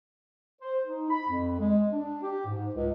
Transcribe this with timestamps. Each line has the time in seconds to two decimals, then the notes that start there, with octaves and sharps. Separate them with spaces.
0.62 C5
0.86 D#4
1.10 B5
1.29 F2
1.60 G#3
1.92 D4
2.22 G4
2.45 G#2
2.75 C#2